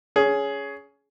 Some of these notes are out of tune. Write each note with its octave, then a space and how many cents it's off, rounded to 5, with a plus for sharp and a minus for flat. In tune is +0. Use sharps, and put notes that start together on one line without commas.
C#4 +15 G#4 +10